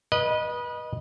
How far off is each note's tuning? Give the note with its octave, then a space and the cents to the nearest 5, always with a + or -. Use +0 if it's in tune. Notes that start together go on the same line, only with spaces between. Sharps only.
B4 -25 D#5 -10